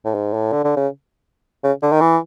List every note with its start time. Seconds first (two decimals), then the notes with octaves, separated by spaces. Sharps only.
0.05 A2
0.14 G#2
0.34 A2
0.52 D3
0.64 D3
0.76 C#3
1.64 C#3
1.82 D3
1.92 D#3
2.01 E3